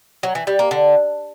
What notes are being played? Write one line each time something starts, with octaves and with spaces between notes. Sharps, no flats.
F#3
E3
G3
A#3
D3